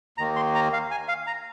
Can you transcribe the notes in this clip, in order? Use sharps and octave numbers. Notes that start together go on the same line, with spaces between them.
D#2 D#3 A#3 A#5
C6
A#5
F5
G#5
F5
A#5